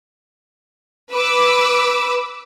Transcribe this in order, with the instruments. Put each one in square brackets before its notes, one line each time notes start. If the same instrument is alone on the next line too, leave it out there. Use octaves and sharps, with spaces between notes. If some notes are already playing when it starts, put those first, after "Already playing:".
[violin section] B4 D6 E6